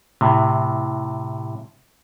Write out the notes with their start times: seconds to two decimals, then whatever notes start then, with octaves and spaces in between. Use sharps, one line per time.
0.21 A2 C3